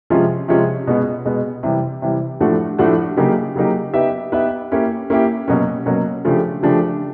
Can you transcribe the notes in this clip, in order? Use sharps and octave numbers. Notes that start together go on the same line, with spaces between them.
C3 F3 G#3 C#4 F4
C3 F3 G#3 C#4 F4
B2 G#3 B3
B2 G#3 B3
C3 E3 G3
C3 E3 G3
A2 F3 A3 D4 F#4
A2 F3 A3 D4 F#4
C#3 F#3 A#3 D#4 G4
C#3 F#3 A#3 D#4 G4
B3 D#4 G4 B4 E5
B3 D#4 G4 B4 E5
A#3 C#4 E4 G4
A#3 C#4 E4 G4
B2 F#3 A#3 C#4
B2 F#3 A#3 C#4
C#3 F3 A3 D4 G4
C#3 F3 A3 D4 G4